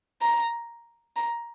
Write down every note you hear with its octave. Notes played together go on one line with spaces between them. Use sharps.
A#5
A#5